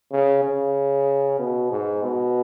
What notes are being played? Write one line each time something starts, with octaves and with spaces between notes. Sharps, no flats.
C#3
C#3
B2
G#2
B2